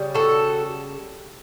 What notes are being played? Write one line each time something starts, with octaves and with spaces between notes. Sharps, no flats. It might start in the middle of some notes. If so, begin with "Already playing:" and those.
Already playing: C#3 G3
F#4 A4